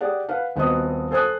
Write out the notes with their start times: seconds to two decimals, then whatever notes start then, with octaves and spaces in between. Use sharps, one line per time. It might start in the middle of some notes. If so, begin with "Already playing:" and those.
0.01 G4 G#4 D5 F#5
0.29 B4 F5 F#5
0.56 D#1 B3 C4 F#4 D#5 D#6
1.11 A4 C5 G#5 A5 D#6 F#6